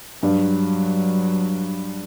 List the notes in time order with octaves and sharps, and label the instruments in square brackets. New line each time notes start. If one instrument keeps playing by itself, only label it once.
[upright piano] G2 [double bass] F#3